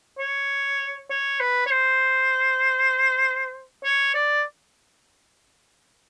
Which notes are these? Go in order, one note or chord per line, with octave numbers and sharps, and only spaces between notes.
C#5
C#5
B4
C#5
C5
C#5
D5